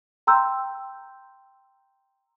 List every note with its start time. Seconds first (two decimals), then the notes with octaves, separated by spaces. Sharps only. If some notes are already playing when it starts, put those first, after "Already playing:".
0.27 G5 A#5 C6 E6 G6